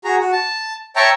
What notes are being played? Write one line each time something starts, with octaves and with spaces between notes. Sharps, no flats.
F#4 G#4 A#5
F#4
A5
C#5 E5 G5 A5 A#5